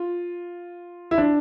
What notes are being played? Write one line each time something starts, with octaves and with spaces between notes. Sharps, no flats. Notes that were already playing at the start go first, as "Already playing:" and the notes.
Already playing: F4
E4
D4